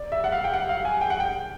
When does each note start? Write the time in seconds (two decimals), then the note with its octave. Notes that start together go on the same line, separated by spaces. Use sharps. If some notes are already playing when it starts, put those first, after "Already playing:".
Already playing: D5
0.12 E5
0.24 F#5
0.32 F5
0.44 G5
0.54 F#5
0.69 F5
0.85 G#5
1.01 G5
1.10 F#5
1.20 G5